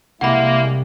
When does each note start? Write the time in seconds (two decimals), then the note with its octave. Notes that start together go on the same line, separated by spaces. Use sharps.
0.21 C2 G#3 A#3 E4 F#5 B5